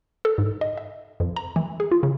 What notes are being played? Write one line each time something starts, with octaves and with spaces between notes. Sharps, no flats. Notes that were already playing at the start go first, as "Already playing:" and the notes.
A4
G#2
D#5
E5
F2
A#5
E3
G#4
F4
C#3